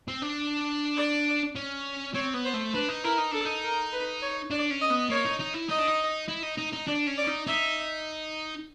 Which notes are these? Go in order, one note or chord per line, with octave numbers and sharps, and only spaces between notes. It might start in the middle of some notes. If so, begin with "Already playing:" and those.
C4
D4
D5
C#4
C4 C#5
B3
C5
A3
D4 B4
D#4
E4 A#4
D#4
D4 A4
D#4
A#4
B4
C#5
D4 D5
C#4
D#5
B3
A#3 C#5
D#4
D#4
E4
D#4 D#5
D4
D#4
E4
D#4
D#4
D#4
D4 D5
C#4
D5
D#4
D#4 E5